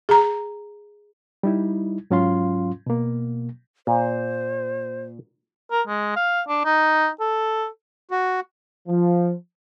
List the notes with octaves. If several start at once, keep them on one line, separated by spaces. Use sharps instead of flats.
G#4 A#5
G3 D#4 E4
G#2 F#3 C#4 F4 F5 C6
B2 A#3
A#2 C5
A#4
G#3
F5
D4
D#4
A4
F#4
F3